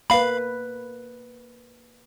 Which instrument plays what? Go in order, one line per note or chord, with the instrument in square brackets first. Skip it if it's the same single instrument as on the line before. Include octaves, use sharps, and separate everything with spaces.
[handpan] A#3 B4 [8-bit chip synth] F5 B5